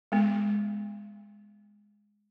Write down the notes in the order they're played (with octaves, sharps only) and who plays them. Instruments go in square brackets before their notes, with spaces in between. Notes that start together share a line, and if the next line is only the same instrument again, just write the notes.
[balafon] G#3 B3